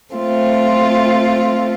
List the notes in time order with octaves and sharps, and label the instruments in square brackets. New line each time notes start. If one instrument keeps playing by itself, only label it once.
[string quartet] A3 C4 F4